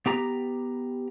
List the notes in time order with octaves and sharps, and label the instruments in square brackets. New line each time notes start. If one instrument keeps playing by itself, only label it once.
[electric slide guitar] B3 G4 A#5